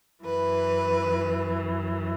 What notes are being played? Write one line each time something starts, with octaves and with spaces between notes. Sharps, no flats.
F#2 E3 B4